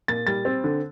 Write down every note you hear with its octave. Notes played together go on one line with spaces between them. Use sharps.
A#2 A6
G3 A6
C4
D3